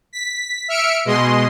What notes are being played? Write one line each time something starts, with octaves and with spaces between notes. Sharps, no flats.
B6
E5 F6 C#7 D7
B2 G#3 D#5 C6